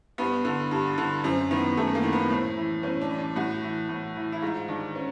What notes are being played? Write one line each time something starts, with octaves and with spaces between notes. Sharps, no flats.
G2 B3
D3
G2
D3
F#2 C4
D#3 B3
F#2 A3
A#3
D#3
B3
A2 C4
E3
A2 C#4
D4
E3
D4
A2 F#4
E3
A2
E3
E4
G#2 F4
D#3 D4
C#4